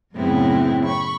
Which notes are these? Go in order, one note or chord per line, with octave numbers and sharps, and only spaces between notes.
F#2 A2 C#3 B3 C4 E4
B5 C#6